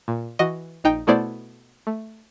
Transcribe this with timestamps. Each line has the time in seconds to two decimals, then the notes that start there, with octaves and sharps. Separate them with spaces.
0.08 A#2
0.39 E3 F#4 D#5
0.84 A#1 D#4 G5
1.07 B2 A3 B3 E4 C5 D5
1.87 A3